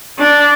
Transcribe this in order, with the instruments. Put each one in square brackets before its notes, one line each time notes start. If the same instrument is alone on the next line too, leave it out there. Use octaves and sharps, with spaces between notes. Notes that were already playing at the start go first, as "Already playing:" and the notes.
[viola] D4